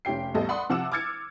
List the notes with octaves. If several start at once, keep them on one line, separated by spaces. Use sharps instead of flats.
F1 C#4 G4 G5 C7
A1 E2 G3 A4 D#5
D5 F#5 B5 C6 D#6
C3 F3 F#5 D6 E6 E7
D6 E6 F6 G#6 A6 C#7